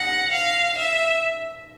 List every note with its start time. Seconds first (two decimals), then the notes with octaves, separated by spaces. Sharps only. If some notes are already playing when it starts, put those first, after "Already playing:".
Already playing: F#5 A#6
0.32 F5
0.78 E5